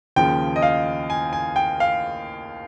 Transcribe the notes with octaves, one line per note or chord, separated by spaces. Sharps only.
D#2 C#3 F3 G5
D#5
F5
G#5
G#5
G5
F5